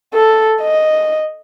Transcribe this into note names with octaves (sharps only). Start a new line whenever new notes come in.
A4
D#5